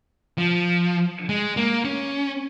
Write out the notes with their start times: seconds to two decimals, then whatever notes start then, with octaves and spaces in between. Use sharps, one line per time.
0.38 F3
1.29 G#3
1.57 A#3
1.85 C#4